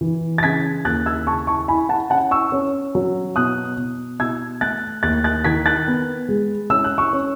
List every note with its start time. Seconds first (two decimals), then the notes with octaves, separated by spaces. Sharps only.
0.01 E3
0.38 A6
0.43 C#3 G#6 B6
0.85 D#2 F#6 A6
1.06 E6 G#6
1.27 C#3 A5 C#6
1.47 A5 C#6
1.68 E4 G#5 B5
1.89 F#5 A5
2.10 C#4 F#5 A5
2.31 C#6 E6
2.52 C#4
2.95 F#3
3.36 B2 D#6 F#6
3.77 B2
4.19 B2 E6 G#6
4.61 A3 F#6 A6
5.03 D#2 F#6 A6
5.24 F#6 A6
5.44 D#3 G#6 B6
5.66 F#6 A6
5.87 B3
6.29 G#3
6.70 C#4 E6
6.84 F#6
6.98 C#6 E6
7.13 C#4